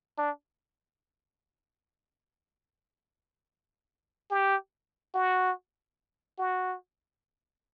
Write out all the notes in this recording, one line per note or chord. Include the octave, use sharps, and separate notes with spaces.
D4
G4
F#4
F#4